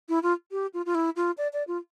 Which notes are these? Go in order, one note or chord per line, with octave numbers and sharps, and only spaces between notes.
E4
F4
G4
F4
F4
E4
F4
D5
D5
F4